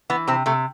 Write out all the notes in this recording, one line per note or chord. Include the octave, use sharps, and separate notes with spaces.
E3 B3
C3 C4
C3 A3